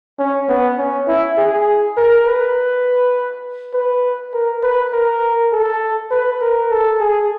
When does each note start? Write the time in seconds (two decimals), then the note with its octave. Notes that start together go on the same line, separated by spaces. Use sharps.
0.19 C#4
0.49 B3
0.78 C#4
1.08 E4
1.38 G#4
1.97 A#4
2.27 B4
3.74 B4
4.34 A#4
4.63 B4
4.93 A#4
5.52 A4
6.11 B4
6.41 A#4
6.71 A4
7.00 G#4